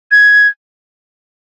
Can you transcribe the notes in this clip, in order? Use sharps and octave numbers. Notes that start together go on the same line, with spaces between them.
G#6